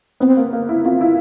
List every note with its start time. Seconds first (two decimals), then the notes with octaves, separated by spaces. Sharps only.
0.20 B3 C4
0.37 A#3
0.53 A#3
0.69 E4
0.85 C4 F4
1.01 E4